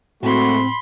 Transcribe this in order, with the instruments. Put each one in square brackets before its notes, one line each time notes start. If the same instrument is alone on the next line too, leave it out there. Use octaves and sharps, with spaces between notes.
[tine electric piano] A2 [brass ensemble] G#3 A3 F#4 [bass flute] C4 [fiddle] B5 C6